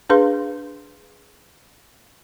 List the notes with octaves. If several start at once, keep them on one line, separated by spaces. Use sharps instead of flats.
D4 G#4 B4 F5 C6